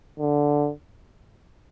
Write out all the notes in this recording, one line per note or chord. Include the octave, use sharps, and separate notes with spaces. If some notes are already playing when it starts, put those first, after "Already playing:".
D3